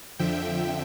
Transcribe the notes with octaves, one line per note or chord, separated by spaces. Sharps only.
F2 D3 F3 E5 G5